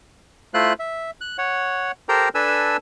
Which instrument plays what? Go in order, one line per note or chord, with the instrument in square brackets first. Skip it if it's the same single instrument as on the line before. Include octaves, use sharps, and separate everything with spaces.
[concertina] A3 E4 F4 C5 F#6
E5
F#6
C#5 F#5
G4 A4 A#4 C5 G5 A#5
D4 A4 B4 G#5 E6